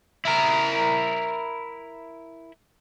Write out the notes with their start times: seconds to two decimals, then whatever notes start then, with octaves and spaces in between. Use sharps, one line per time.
0.25 E4 A#4